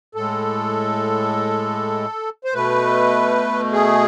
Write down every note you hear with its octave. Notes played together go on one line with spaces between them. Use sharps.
A2 G#3 A4
C5
B2 A3 B4
G#4